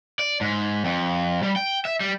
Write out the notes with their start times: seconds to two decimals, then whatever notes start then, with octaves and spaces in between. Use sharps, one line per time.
0.19 D5
0.41 G#2
0.85 F2
1.43 G3
1.56 G5
1.85 E5
2.00 G3